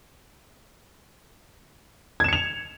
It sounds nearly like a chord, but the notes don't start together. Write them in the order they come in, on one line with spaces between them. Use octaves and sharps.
G#6 E7 C#7 F7